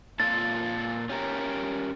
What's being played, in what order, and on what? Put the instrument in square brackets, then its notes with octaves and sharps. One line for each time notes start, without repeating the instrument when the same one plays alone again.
[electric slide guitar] A#2 F4 A4 [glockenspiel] A6
[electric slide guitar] C#4 G4 A#4